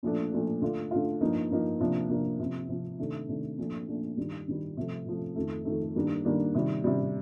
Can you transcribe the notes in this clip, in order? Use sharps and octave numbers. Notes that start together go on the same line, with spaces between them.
A#2 F3 A3 D4
A#2 F3 A3 D4
D3 A3 D4 F4
D3 A3 D4 F4
G2 F3 A#3 D#4
G2 F3 A#3 D#4
C3 F3 A#3 D4
C3 F3 A#3 D4
C3 F3 C4
C3 F3 C4
C3 D#3 A3 D4
C3 D#3 A3 D4
A#2 F3 A3 D4
A#2 F3 A3 D4
G2 D#3 G3
G2 D#3 G3
C3 F3 A3
C3 F3 A3
F2 D#3 A3
F2 D#3 A3
G2 D#3 G3 A#3 D4
G2 D#3 G3 A#3 D4
C3 D#3 G3
C3 D#3 G3